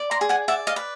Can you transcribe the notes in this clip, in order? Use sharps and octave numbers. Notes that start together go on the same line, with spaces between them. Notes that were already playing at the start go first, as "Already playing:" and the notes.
Already playing: D5
A#5 C6
G#4
F#5 G#5
D5 E5 F#5
D#5 F5
B4